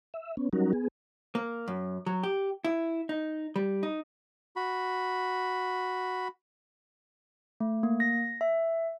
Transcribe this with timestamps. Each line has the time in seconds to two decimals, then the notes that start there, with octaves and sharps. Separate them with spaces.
0.14 E5
0.37 B3 C#4
0.53 F#3 G3 C#4 D#4 F#4 A#4
0.73 B3 G#4
1.35 A#3
1.68 F#2
2.06 F#3
2.23 G4
2.65 E4
3.09 D#4
3.56 G3
3.83 D#4
4.56 F#4 B5
7.60 A3
7.83 A#3
8.00 A#6
8.41 E5